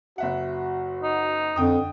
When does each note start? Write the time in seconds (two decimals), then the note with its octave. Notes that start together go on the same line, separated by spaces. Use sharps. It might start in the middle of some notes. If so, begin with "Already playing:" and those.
0.18 F#1 F#4 E5 F#5
1.03 D#4
1.56 F2 D3 G5 D#6